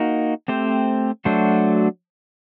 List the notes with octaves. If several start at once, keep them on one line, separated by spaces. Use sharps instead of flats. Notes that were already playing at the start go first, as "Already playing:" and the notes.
Already playing: A#3 D#4 F#4 A#4
A3 C4 G4 C5
F#3 A3 D4 F#4 C5